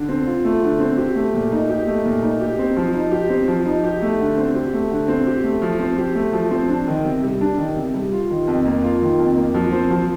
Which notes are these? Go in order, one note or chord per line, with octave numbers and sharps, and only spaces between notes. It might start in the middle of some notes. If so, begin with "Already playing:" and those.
Already playing: D3
C4
F4
A3
D3
C4
G4
A3
A#2
D#4
G4
A3
A#2
D#4
G4
C4
F3
D#4
G4
C4
F3
D#4
G4
A3
D3
C4
G4
A3
D3
C4
G4
A3
F3
C4
G4
A3
F3
C4
D4
D#3
C3
G3
D4
D#3
C3
G3
F4
D#3
F2
A#3
F4
D#3
F2
A#3
F3
C4
F3